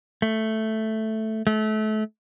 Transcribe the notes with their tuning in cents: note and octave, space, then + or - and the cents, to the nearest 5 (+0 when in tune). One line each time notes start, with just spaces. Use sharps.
A3 +0
A3 -30